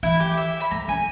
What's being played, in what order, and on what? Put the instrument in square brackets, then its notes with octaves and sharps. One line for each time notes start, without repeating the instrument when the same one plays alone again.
[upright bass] E3 [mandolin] E4
[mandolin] G4
E5
B5
[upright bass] D#3 [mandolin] A#5
[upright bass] C#3 [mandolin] G#5